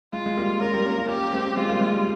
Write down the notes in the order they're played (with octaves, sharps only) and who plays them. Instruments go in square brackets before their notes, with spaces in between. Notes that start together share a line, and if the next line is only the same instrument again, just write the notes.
[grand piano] G#3 [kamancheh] F4
[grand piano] G#3
G3 A#3
[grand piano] A#3 C#4 [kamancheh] A#4
[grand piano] G3 A#3
A#3 C#4
C#4 F4
[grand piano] A#3 C#4 [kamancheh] G4
[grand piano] G#3 C4
[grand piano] G#3 C4 [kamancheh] F4
[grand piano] G3 A#3
G#3
G3